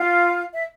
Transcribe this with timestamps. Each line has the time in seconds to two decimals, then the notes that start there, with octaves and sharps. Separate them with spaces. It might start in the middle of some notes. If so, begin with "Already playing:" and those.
Already playing: F4 F5
0.54 E5